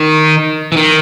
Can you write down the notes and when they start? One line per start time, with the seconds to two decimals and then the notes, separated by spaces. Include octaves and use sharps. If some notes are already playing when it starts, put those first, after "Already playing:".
Already playing: D#3
0.72 E3
0.77 D#3